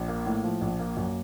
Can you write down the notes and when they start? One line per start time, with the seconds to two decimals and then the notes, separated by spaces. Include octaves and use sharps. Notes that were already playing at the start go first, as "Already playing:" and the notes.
Already playing: A#1
0.08 A#3
0.26 A2
0.44 F3
0.61 A#1
0.79 A#3
0.97 F#2